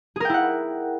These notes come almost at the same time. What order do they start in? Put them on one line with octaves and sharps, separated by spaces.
G#4 A#4 G5 E4 F#5